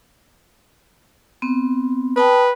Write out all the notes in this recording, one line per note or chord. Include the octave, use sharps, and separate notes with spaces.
B3 C4
B4 G5 A5 D#6